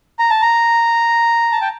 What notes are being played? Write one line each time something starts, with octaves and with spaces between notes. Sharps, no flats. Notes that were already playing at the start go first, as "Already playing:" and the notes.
A#5
A5
A#5
A5
G5